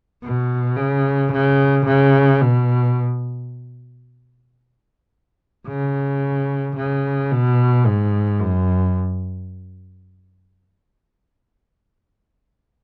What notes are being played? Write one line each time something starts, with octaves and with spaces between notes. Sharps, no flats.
B2
C#3
C#3
C#3
B2
C#3
C#3
B2
G#2
F#2